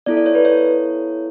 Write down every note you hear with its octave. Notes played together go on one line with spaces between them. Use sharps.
B3 E4 A4 D5
D5
C#5
B4
C#5